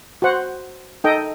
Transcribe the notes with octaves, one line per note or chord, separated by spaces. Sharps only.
F#4 C5 F#5
D#4 A4 D#5 G5